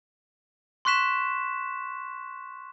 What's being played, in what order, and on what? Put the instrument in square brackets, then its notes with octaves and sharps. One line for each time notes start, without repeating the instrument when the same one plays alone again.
[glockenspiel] C6 C#6 F#6 B6 E7